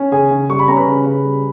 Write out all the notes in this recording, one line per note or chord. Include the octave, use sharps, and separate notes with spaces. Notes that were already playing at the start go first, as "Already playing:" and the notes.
Already playing: C#4
C#3 G#4 G#5
C#3
G3 C#6
B5
C#4 A#5
B4 B5
C#3
C#3
G3